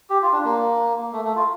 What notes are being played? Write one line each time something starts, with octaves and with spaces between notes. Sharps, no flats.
G4
F4
D4
A#3
A3
A3
F4